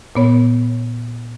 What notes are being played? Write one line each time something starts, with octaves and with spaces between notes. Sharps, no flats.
A#2 B3 C#5